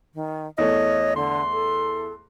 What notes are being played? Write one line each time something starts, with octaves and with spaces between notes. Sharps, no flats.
D#3
E2 A3 C#5 D#5
D3 C6
A4